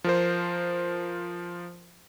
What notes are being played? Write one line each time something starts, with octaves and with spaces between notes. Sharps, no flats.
F3 A#4 C5